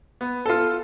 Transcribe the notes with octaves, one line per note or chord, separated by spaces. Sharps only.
B3
F4 A4